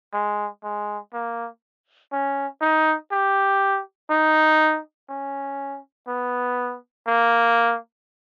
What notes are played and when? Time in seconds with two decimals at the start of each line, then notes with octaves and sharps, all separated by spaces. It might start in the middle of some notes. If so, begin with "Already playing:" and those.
0.13 G#3
0.64 G#3
1.13 A#3
2.12 C#4
2.62 D#4
3.12 G4
4.10 D#4
5.09 C#4
6.08 B3
7.07 A#3